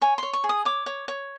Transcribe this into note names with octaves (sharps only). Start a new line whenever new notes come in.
C#5 G#5
C#5 C6
C#6
G#4
D#6
C#5 D6
C#5
C#5